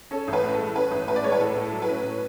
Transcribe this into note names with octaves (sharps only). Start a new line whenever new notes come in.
C#4 A4
A1
B4
A2
A4
G#3
C#4 B4
A1
A2 B4
D5
G#3 C#5
B4
A2 A4
A2
A4
F#3
B4
C#4
A2